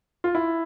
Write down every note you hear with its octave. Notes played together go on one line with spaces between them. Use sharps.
F4
E4